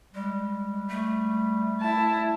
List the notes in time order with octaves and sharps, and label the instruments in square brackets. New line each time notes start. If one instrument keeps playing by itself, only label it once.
[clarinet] G3 [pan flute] G#3
[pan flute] A3
[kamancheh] E4 A5